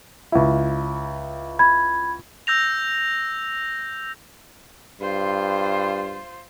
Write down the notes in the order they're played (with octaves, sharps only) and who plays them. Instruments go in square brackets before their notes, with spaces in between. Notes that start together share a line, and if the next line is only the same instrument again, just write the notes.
[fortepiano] C#2 E4
[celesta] B5 G#6
[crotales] E6 G6 A#6 F7
[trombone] G2 [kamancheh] F4 C5